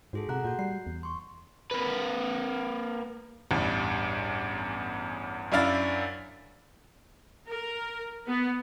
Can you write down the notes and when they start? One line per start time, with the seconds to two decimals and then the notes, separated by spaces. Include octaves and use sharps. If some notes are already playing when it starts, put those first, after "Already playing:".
0.13 G#2 F#4 G#4 A4
0.29 C3 F#5 A#5 F#6
0.45 A#2 F#4 G6
0.59 G3 C7
0.87 E2
1.03 C6 C#6
1.71 A#3 B4
3.51 A1 E2 G2
5.52 F#2 D4 E4 F5 B5 A6
7.48 A#4
8.28 B3